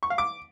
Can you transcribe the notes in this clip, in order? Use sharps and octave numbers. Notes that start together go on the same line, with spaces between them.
C#6
F5
D6